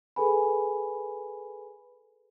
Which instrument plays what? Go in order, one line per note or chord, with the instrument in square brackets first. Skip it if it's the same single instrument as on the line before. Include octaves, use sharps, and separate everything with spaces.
[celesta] G#4 A4 B4 G#5 B5